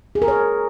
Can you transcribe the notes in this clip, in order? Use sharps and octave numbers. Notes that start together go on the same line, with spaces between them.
G#4
A#4
C#5